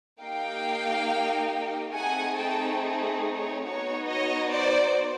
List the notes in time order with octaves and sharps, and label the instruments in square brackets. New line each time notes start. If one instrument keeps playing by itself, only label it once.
[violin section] A#3 D#4 G4 F5 G5
A3 C4 D#4 G#4 F#5 G#5
G5 A5
C#5
B3 D#4 F#4 C#5
C#5 D#5
C5 D5